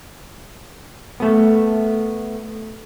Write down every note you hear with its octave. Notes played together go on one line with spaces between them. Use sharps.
A3 B3